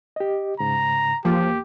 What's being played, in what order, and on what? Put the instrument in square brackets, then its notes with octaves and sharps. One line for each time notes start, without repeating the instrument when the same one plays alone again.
[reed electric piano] G4 D#5
[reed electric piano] C2 G#2 C#3 [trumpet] A#5
[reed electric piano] E2 A#3 [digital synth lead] F3 [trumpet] G4